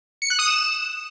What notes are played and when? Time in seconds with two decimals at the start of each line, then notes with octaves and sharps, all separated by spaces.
0.22 C#7
0.30 F#6
0.39 D#6
0.47 E7